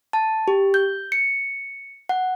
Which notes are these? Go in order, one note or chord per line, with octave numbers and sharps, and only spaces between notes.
A5
G4
G6
C#7
F#5